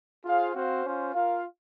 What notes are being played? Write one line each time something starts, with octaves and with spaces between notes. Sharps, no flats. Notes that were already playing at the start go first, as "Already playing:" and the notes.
F4 G#4 C5 F5
C4 F#4 C5 F5
C#4 F4 C5
F4 A#4 F5